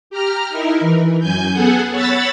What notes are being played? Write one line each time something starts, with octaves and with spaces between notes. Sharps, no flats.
G4 A#5 F6
D#4 E4 A#4
E3
F#2 G#5 G6
B3 G#4 A4 F#5 G#5
C#5 F#5 B5 E6 A6